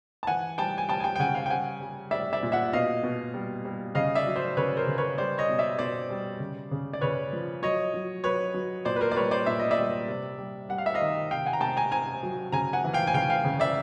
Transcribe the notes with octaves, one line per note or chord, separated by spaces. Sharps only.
A5
E3 F#5 G#5
G3 G5 A5
G#5
G3 G5 A5
G#5
G5 A5
G5
C#3 F#5 G#5
F5 G5
G5
G3 F#5 G#5
G3
G3 D5 E5
D5 E5
A#2
E5 F#5
B2 D#5 F5
B2
G3
G3
C#3 D#5 F5
D5 E5
F#3
C5 D5
C#3 B4 C#5
A#4 C5
C#3
B4 C#5
G3 C5 D5
C#5 D#5
B2
D5 E5
B2 C5 D5
G3
C#3
C#3
D5
C#3 B4 C#5
F3
F#3 C#5 D#5
F#3
F#3 B4 C#5
F#3
A#2 C5 D5
B4
A#4 C5
D5
G3 B4 C#5
C5 D5
A#2 E5
D#5
D5 E5
G3
C3
G3
G3 F#5
F5
E5
D#5 F5
D#3
C3 F5 G5
F#5 G#5
A#5
C3 G5 A5
G#5 A#5
C3 G#5 A#5
F#3
C#3 G#5 A#5
F#5 G#5
E3
F5 G5
G#5
C#3 F5 G5
F5 G5
C#3
D5 E5